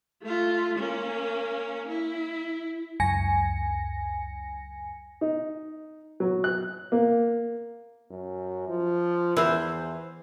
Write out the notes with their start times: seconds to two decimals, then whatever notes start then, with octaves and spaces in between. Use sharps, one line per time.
0.22 A3 F4
0.79 A#3 C#4
1.88 E4
3.00 C#2 F#2 G#5 A#6 C#7
5.21 D#4
6.20 F#3
6.44 F#6
6.92 A#3
8.10 F#2
8.69 F3
9.37 E2 E3 C5